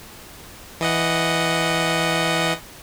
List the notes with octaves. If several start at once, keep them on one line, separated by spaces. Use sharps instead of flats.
E3 D#5 F#5